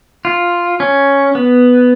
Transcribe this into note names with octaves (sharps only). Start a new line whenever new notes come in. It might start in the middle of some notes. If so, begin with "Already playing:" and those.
F4
C#4
B3